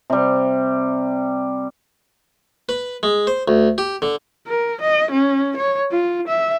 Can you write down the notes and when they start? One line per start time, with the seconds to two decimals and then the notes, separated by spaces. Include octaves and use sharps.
0.10 C3 G3
2.69 B4
3.03 G#3
3.27 C5
3.48 D2
3.78 G4
4.02 D3
4.47 A#4
4.81 D#5
5.11 C#4
5.57 C#5
5.91 F4
6.28 E5